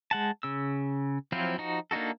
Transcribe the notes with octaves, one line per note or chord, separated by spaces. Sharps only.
G#3 F#5 A5
C#3 E6
F3 F#3 C4 E4 F4
F3 D#4 F#4
A#3 D4 D#4 F#4 A4